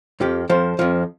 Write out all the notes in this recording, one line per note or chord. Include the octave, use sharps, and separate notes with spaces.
F2 F3 G4
F2 F3 C5
F2 F3